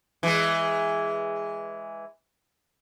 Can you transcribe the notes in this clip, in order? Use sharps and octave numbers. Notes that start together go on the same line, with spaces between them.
E3 G#3